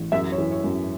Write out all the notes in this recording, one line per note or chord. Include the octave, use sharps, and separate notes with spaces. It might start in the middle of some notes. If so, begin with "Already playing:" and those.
Already playing: A1
F#2 E5
C#5
E3
C#5
F#2